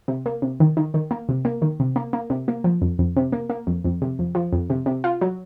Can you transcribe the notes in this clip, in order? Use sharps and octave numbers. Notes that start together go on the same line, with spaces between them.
C3
A#3
C3
D#3
D#3
D#3
A#3
C3
A#3
D#3
C3
A#3
A#3
C3
A#3
F3
F2
F2
C3
A#3
A#3
F2
F2
C3
F2
F3
F2
C3
C3
F4
F#3